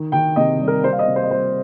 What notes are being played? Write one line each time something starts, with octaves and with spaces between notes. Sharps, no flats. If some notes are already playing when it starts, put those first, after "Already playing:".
Already playing: D#3
D#3 G5
C3 D#5
G3
A#4
G3 C5
F5
D#5
C3
C5
D#5
G3 C5